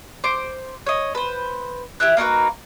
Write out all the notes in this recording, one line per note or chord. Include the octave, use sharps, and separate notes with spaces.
C5 D6
C#5 D#5
B4 C5
E4 G4 E5 F#6
A#3 D#4 F#4 B4